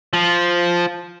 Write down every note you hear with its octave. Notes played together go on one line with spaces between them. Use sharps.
F3